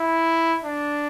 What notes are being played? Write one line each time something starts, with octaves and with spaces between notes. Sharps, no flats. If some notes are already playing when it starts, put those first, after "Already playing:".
Already playing: E4
D4